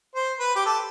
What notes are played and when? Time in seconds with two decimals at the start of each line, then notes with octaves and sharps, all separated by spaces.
0.15 C5
0.39 B4
0.55 G4
0.66 A4